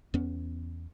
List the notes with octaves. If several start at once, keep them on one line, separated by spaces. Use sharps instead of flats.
E2 B3 C#4